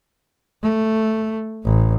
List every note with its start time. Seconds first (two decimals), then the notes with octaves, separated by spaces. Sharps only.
0.62 A3
1.64 A1